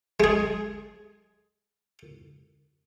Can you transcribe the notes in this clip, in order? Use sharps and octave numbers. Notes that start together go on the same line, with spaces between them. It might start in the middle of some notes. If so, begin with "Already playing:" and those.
G#3 G#4